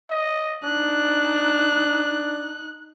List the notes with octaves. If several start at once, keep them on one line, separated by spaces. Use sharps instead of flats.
D#5
D4 D#4 F#6